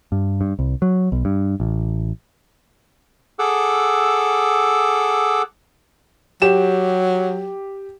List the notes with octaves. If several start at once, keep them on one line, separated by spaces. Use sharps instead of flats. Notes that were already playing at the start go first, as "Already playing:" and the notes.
G2
G2
C2
F#3
B1
G2
A1
G#4 A4 F#5 D6 E6
F#3 G4 E7